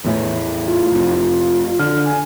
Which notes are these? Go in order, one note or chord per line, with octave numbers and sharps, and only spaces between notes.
E2 A2 E3
F4
F1
D3 F6
G#5